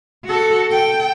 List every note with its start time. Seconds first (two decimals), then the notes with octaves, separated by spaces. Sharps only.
0.25 F#4 A4
0.67 A4 G5